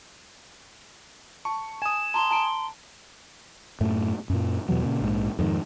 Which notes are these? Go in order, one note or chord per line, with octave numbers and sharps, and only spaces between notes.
A5 C#6
G#5 D#6 E7
A5 A#5 C6
A5 A#5 D7
F#2 A2 A3
F#2 A#2
E2 B2 E3 F#3
A#2 C#3
A#1 G#2
F2 G#2 C3 D#3